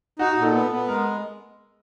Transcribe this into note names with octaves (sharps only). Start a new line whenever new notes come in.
D#4 F#4
F#4
A#2
A4
B3
B3
G#3 A#4